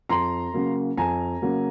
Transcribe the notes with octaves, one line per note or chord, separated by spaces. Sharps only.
F2 A#5 C6
C#3 F#3 A#3
F2 G#5 A#5
C#3 F#3 A#3